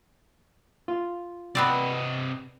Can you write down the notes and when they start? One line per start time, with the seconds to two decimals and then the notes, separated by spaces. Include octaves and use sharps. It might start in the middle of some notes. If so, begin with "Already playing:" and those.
0.88 F4
1.55 C3 B3 C4 D5 D#5